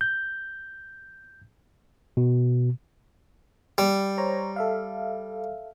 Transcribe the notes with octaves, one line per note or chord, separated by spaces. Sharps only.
G6
B2
G3
C5 C#5 A#5
A4 E5 F5